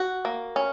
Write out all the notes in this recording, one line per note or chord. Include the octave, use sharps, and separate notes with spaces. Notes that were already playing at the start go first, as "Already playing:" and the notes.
Already playing: F#4
A#3
C#4